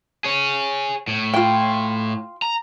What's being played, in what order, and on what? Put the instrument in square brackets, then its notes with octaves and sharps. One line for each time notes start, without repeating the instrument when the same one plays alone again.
[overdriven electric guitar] G#4 C#5
A2
[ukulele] F4 G5
[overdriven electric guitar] A#5